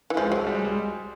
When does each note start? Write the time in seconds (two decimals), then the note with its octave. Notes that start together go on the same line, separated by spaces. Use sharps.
0.10 E3
0.17 F3 G#3
0.31 F#3 G#3
0.47 G3
0.55 G#3
0.65 G3